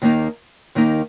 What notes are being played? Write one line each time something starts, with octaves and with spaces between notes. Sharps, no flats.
D#2 D#3 A#3 D#4
D#2 D#3 A#3 D#4